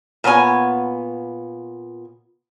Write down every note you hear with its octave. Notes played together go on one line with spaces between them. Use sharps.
A#2 B3 C#5 G#5